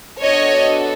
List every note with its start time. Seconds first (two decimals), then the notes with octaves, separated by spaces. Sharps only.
0.21 B3 D4 F#4 A4 C#5 D#5